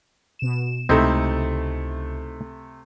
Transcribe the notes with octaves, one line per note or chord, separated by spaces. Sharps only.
B2 E7
C#2 C3 A3 C4 D#4 E4